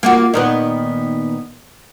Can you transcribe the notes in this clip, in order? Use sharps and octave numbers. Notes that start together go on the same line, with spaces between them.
A#3 F4 F#4
A#2 D#3 B3